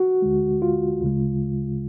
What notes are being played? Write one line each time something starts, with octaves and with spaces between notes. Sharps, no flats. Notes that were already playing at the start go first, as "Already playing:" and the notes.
Already playing: F#4
D2 D3 G#3
F4
D2 C#3 G#3